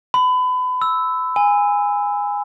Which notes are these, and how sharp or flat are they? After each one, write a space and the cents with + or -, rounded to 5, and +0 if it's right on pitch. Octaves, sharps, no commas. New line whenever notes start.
B5 +30
E6 -5
G#5 -15